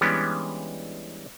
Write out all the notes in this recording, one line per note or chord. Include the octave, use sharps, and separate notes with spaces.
E3 G3 G#3 B3 C#4 D4